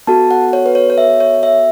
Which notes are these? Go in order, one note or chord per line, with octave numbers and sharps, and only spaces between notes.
B3 F#4 A4 A5
F#5
C#5
B4
C#5
C#5
E5
C#5
E5